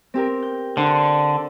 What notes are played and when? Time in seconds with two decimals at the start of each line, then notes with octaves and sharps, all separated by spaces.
0.14 C4 G4 A#4
0.43 G6
0.77 D3 D4 C5